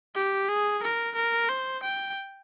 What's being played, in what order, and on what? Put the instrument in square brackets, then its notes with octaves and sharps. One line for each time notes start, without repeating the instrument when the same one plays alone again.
[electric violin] G4
G#4
A#4
A#4
C5
G5